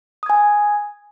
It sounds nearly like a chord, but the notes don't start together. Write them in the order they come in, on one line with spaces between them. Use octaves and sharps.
D#6 G#6 G#5